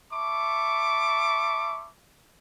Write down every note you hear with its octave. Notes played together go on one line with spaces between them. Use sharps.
E5 A5 B5 C#6 D6